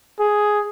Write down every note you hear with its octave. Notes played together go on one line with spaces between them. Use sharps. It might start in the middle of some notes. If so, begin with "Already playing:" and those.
G#4